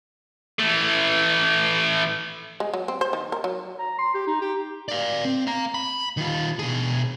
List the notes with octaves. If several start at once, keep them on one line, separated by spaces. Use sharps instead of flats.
E3 A3
G#3
F#3
C4
C5
D#3
A#4
F#3
A#5
C6
G4
D#4
G4
D5 F5
C4
F5 A#5
B5
D#3 F4
B2 G#4